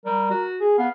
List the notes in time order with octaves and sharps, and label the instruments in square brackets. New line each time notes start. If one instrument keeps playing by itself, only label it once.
[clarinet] G3 [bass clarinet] A#4
[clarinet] F#4
[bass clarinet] G#4
[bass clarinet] B3 [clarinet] F5